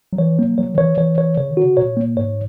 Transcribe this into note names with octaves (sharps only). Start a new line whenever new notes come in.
F#3
E3 C#5
F#3 A#3
F#3 C#5
D#3
E3 C#5
E3 C#5
C#5
C#3 C#5
D#3
F#4
C#3
A#2 C#5
A#3
G#2 C#5